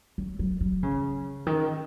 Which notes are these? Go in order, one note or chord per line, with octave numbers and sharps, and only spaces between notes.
F#3
F#3
F#3
C#3
D#3